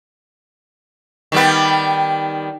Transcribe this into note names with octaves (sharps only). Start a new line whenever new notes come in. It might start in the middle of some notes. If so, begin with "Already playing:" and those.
D#3 G3 B3